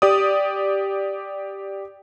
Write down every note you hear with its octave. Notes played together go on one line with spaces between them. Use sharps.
G4 D5 D#6